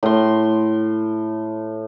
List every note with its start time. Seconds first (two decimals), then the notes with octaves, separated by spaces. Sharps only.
0.03 A2 C6